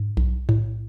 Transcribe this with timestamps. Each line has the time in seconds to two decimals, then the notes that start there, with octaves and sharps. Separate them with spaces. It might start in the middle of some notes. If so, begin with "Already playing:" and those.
Already playing: G#2
0.17 B1
0.49 A2